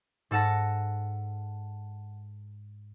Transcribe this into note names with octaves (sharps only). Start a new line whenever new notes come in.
G#2 A4 F#5 A5 A#6